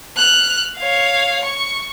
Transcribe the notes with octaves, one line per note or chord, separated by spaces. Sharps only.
F6 F#6
C#5 F5
C#6